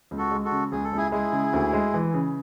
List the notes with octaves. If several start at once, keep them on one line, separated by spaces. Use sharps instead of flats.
C#2
F#4 A4
G#3
F#4 A4
C#3
C#2 G#4
A4
C#2 E4 G#4
G#3 E4 G#4
C#3
D2
G#3
E3
C#3